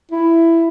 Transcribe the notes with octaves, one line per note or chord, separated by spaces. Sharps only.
E4